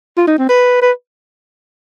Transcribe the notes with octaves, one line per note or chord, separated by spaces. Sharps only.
F4
D#4
C4
B4
B4